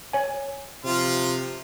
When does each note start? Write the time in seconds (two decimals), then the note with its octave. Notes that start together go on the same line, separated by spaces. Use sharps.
0.13 C#5 G#5
0.85 C3 F3 F4